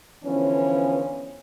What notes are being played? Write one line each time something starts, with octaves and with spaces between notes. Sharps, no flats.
D3 E3 F3 B3 C#4